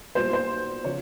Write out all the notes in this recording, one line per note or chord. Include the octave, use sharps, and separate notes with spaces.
B1 A#2 G3 C5
C5
C#3 F3 C#5